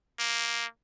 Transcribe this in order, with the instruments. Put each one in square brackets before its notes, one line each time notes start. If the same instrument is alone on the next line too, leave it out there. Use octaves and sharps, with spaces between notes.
[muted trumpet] A#3